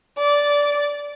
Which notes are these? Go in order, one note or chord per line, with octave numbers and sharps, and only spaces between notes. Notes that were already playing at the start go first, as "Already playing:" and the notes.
D5